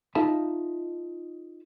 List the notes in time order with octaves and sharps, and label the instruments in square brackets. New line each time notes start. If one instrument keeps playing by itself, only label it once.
[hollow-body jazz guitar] D#4 F4 A4 E5 A5 B5